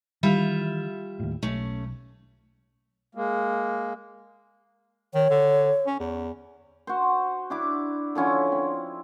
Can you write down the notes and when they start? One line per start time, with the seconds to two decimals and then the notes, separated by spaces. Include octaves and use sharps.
0.23 D#3 E3 G3 F4 E5
1.20 D#2 A2
1.43 B1 A3 C#4
3.15 G#3 A#3
5.14 D#3 C#5
5.30 D3
5.86 C#4
5.99 E2
6.87 F#4 C5
7.50 D4 E4 D6
8.15 D3 F3 C#4 E4
8.52 C4